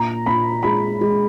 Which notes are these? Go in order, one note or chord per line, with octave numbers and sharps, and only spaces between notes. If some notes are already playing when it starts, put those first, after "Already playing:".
Already playing: A#2 A#5
A#2 B5
G#3 B5
G#3